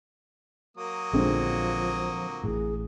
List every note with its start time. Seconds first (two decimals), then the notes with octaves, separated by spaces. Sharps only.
0.77 F#3 A#3 D#6
1.13 A#1 D3 F3 G#3 C4
2.44 A1 A2 G#4